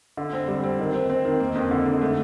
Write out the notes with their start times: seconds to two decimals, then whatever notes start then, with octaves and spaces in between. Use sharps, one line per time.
0.17 D3
0.33 C4
0.48 G3
0.64 C4
0.79 D#3
0.94 C4
1.10 C4
1.25 D#3
1.40 A#3
1.55 F2
1.71 D3
1.86 D3
2.02 A3